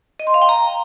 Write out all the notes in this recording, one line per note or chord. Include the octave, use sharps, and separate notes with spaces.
D#5
C6
F5
G5
A#5